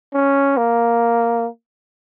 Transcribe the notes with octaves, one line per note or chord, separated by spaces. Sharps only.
C#4
A#3